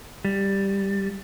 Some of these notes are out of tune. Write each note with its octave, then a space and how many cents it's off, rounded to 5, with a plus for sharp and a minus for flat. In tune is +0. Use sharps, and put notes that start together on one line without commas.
G3 +5